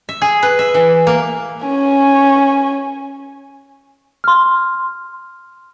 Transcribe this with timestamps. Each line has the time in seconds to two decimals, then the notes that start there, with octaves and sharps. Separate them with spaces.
0.09 E5
0.22 G#4
0.43 B4
0.59 E5
0.74 E3
1.07 A#3
1.66 C#4 G#5
4.24 C6 F6